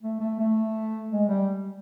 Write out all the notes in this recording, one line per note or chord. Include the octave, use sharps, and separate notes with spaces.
A3
A3
A3
G#3
G3